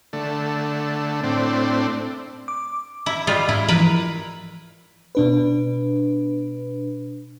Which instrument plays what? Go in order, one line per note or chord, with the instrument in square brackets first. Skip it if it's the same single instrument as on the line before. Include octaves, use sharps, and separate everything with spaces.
[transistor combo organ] D3 A3
A2 C4 D4
[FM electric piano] D6
[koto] E4
G3 G#3 F4
[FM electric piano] G#2 [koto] E4
[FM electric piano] E3 F3 [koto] A#4 B4
[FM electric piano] B2 D4 B4